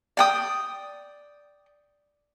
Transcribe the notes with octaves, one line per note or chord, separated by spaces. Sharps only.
D5 G5 D#6